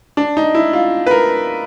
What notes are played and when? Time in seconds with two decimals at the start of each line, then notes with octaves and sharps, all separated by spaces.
0.17 D4
0.37 D#4
0.55 E4
0.73 F4
1.06 B4
1.11 A#4